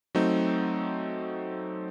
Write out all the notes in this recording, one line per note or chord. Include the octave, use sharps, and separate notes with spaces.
F#3 A3 C4 D#4